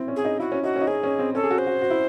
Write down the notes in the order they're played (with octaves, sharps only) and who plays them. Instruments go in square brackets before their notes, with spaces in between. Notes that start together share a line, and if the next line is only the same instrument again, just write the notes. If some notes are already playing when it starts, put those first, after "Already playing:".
Already playing: [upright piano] C4 E4
C#4
[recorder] G#4
[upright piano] D#4
[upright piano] E4 [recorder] F#4
[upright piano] C#4
[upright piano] D#4 [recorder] F#4
[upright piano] C#4
D#4
[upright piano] C#4 [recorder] G#4
[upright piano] C#4
C4
[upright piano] C#4 [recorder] A4
[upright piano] G#4
F#4
[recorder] C5
[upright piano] F#4
F#4
E4